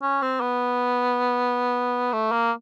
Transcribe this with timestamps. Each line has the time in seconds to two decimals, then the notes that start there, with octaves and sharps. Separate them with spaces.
0.02 C#4
0.22 C4
0.40 B3
2.13 A3
2.32 A#3